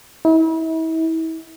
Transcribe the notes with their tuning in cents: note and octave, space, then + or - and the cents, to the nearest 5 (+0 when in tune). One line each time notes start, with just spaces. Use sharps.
E4 -40